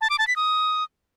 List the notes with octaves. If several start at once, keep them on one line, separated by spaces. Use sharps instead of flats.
A5
D6
A5
B6
D#6